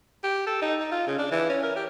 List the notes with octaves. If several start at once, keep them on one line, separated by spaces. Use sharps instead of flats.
G4
A4
D#4
D#4
F4
C#3
D4
E3
C#4
A#4
G4